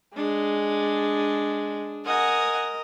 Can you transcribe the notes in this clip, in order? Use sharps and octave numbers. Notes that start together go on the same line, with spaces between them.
G#3 D4 G#4
A#4 D#5 F#5 G#5